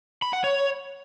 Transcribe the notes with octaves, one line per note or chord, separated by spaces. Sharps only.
B5
F#5
C#5